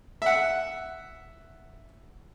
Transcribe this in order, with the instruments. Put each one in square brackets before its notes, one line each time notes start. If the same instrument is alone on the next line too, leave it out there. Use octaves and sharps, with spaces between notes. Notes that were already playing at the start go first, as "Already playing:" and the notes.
[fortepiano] E5 F#5